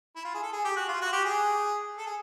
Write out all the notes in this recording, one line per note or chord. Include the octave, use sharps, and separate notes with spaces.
E4
F4
G#4
A4
G#4
G4
F#4
F4
F#4
G4
G#4
A4
G#4